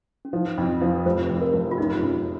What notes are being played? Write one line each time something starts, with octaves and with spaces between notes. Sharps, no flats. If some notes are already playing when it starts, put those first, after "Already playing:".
C#4
F3 D#4
F2
F3
F1 C5
F2
A#4
F1
F4
F#2 D#4
F#2